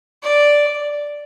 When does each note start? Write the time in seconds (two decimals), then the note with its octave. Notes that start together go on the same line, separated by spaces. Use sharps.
0.23 D5